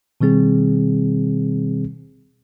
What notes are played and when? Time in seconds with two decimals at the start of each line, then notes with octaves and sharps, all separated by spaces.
0.21 B2 D#3 G3 C4 G#4